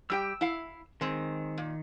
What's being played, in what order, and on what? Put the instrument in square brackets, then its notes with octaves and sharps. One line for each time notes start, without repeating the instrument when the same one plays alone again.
[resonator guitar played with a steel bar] G3 G4 G5 [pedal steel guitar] E6
[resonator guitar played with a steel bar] E4 F5
[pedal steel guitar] D#3 [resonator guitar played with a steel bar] G#3 C4
[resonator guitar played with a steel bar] A#2